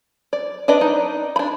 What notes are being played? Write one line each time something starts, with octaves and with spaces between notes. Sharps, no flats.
D5
D4 B4 D5 D#5
D#4
D4 B5